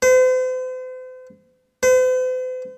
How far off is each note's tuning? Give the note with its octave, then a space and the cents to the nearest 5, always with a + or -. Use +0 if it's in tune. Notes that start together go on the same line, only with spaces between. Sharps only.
C5 -40
C5 -45